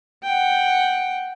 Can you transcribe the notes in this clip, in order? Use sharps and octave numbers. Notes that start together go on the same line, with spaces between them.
F#5 G5